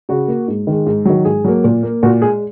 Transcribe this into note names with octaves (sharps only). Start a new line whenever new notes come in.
C#3 F#4
A#3
G#2
D#3 G#3
G#2
D#3 F#3
G#2 G#4
F#3 A#3
A#2
A#3
A#2 F#4
G#3 G#4